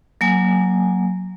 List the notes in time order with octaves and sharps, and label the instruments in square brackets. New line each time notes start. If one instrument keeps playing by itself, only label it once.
[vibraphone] F#3 A#3 G#5